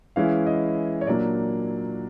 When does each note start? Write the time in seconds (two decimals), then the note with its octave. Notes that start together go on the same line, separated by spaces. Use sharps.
0.16 E3 G#3 C#4 E4 F5
0.46 D#5
1.01 C#5
1.07 A#2 F#3 A#3 D4 D5